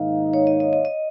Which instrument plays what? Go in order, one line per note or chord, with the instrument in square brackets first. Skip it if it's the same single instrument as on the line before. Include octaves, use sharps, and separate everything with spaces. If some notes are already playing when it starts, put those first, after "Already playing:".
Already playing: [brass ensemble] G#2 D#3 A#3 D#4 [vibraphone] F5
[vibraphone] C#5
D#5
D#5
D#5
D#5